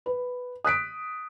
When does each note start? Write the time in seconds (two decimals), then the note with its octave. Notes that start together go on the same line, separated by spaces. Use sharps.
0.06 B4
0.65 D#6 F#6 B6 D7